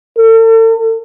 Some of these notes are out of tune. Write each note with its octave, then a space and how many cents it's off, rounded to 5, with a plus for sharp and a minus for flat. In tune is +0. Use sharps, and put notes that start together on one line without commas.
A4 +40